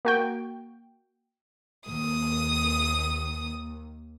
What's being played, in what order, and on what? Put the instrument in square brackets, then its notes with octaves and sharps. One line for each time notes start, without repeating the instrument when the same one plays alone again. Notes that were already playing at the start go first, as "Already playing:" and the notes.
[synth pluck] A#3 F#4 G5
[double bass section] D#2 [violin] D#6